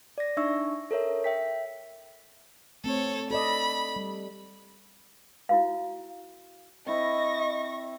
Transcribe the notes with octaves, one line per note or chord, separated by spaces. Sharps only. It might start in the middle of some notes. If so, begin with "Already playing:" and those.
D5 A#6
D4 D#4 E5 C#6 E6
A4 A#4 C#5 E5
E5 G5 B6
A3 C4 A4 C#5
A4 D5 D#5 B5
G3
E4 F#4 F5
C4 E4 D#5 C#6 A#6